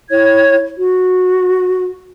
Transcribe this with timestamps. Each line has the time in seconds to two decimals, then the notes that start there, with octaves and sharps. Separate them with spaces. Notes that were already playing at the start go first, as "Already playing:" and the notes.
0.11 E4 C#5 G#6
0.77 F#4